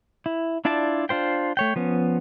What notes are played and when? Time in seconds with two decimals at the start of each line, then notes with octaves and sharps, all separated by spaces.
0.26 E4
0.65 D4 E4 F4 D5 A5
1.09 D4 F4 C5 G5
1.57 A3 C#5 G5
1.76 F3 B3 C#4